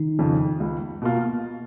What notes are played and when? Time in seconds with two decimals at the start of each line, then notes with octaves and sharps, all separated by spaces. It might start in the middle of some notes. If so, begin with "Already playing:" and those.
Already playing: D#3 D#4
0.19 F2 C#3
0.60 C#2
1.02 B2 A#3 F4